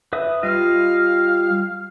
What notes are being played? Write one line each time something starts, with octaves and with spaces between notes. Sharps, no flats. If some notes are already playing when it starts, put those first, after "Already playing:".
B4 E5 D#6
G3 F4 D#5 F5